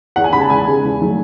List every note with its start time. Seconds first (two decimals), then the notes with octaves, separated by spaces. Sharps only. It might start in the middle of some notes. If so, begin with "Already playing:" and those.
0.16 E2 F#5
0.24 G#5
0.33 C#3 G#3 B5
0.41 A5
0.50 E2 G#5
0.66 C#3 G#3
0.84 E2
1.00 D#3 F#3 A3